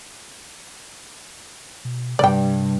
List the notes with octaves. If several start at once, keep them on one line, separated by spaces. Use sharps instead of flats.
B2
G2 C3 D5 G5